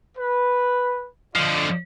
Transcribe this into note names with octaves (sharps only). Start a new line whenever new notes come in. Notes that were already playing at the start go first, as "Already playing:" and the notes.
B4
D3 F3 F4 D5 D#5